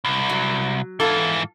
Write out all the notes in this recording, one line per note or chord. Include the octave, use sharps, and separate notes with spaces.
C2
F#3
G#2 E3 F4 A4